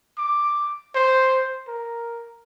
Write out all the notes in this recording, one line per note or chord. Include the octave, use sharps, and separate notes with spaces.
D6
C5
A#4